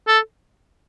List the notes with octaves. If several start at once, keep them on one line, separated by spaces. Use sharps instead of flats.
A4